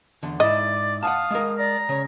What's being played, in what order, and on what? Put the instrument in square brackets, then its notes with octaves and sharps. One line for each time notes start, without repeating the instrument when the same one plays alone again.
[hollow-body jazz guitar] E2 D3
[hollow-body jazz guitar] G#2 E4 [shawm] D5 [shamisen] D#5
[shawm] F5 [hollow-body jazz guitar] F#5 G#5 A5 [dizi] D#6
[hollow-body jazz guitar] G#3 A#4
[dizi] D5 [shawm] A#5
[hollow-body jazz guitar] C#3 [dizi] C#5